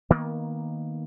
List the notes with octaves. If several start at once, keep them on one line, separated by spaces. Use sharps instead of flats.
D#3 A#3 B3